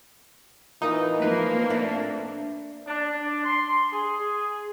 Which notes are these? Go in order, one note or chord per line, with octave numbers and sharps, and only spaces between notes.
E3 D#4 F4 A#4 D#5
F3 A#3 B4
A3 C4 D4 A4
D4
C6
G#4